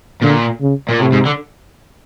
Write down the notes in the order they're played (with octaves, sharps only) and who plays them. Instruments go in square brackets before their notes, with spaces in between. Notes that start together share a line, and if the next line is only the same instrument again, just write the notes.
[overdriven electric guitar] A#2 [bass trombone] D3
[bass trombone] C#3
[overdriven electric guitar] A#2
[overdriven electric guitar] A2 [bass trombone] C3
[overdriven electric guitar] G#2
D3